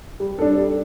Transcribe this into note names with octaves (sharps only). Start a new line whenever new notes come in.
G3
D4 A4
G3